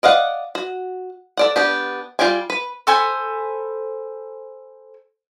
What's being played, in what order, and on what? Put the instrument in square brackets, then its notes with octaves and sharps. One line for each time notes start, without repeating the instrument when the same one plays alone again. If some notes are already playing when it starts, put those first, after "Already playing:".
[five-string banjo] D5 D#5 F5 F#5
F#4
A4 D5 F#5
B3 D4 G4
G3 F4 D5 G5 G#5
B4
[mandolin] A4 C5 G#5 B5